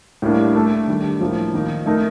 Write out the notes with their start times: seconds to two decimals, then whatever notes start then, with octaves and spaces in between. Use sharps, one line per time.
0.22 A2 G3 A#3 D4
0.55 A3 D4 A4
0.87 D#3 G3 D4
1.21 A2 F3 A#3
1.53 D#3 A#3 D#4
1.86 A3 D#4 A#4